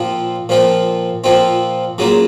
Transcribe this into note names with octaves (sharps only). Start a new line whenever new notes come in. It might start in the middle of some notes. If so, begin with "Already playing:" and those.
Already playing: A#2 F3 C4 F4
A#2 F3 C4 F4
A#2 F3 C4 F4
C#3 F#3 A#3 F4